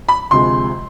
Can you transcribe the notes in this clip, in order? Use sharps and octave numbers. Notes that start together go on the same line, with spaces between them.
B5
D2 C3 F3 G#3 C6